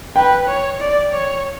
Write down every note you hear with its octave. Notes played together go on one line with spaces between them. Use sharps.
B4 G5
C#5
D5
C#5